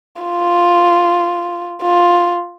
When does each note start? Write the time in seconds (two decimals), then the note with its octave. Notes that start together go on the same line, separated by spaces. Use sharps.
0.22 F4
1.82 F4